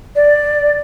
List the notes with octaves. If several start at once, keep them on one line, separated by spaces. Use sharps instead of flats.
D5